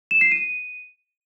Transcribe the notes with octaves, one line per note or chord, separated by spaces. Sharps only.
E7
C7
D#7